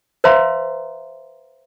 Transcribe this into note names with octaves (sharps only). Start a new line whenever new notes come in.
B4 C5 E5 F5 A#5 C6